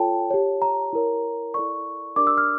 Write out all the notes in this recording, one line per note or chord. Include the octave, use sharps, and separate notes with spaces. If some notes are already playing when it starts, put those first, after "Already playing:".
Already playing: F4 A4 C#5 G5 A5
G4 C#5
A#5
E4 A#4 C#5
E4 A4 D5 C#6
D4 G4 A#4 D5 D6
E6
F6